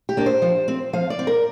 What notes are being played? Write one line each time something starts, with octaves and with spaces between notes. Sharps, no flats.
G4
A#3 D4 D5
C5
F3
C4
F3 F5
D5
C4
A#4